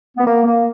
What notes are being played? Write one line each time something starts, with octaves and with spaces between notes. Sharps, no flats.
B3
A#3
A#3